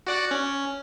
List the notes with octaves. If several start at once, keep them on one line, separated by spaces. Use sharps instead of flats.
F#4 D5 F#5
C#4